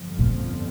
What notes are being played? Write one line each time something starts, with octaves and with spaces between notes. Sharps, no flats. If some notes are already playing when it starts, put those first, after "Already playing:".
Already playing: G1 F2 D3 F3
A#2